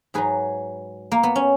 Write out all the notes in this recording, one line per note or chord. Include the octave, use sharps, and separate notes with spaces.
G#2 F#3 G#4 B4
A#3
B3
C#4